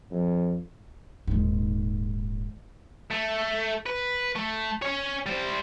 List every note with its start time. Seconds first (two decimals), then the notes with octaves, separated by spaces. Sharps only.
0.11 F2
1.27 D#1 G#2
3.11 A3
3.86 B4
4.36 A3
4.82 C#4 C#5
5.26 G3 C5